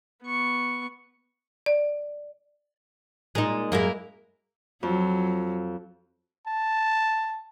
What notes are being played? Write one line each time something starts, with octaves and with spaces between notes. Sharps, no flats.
B3 C#6
D5
A#2 G#3 D#4
F#2 G#3 A#3 E4 A#4
F2 F#3
A5